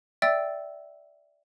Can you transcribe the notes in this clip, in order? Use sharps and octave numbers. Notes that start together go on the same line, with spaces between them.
D5 E5 G5 E6 A6